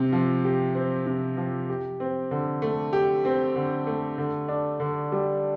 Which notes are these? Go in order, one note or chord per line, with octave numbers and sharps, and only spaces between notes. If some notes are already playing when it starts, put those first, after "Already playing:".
Already playing: C3 C4
F3
G4
C4
C3
F3
G4
C4
D3
A3
G4
C4
D3
A3
D3
D4
D3
G3